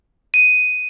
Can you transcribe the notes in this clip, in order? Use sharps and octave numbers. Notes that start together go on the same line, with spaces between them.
D#7